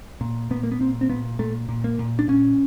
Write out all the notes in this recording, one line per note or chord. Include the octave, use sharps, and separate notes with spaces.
A#2
A#2 B3
A#3
B3
A#2 C4
C4
A#2 B3
A#2 A3
A#2
A#3
A#2
D4
A#2 C#4